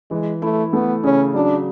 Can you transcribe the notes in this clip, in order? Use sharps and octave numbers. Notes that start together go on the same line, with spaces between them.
E3 G#3
A3 E4
A3 B3
C#3 C#4
F#3 D4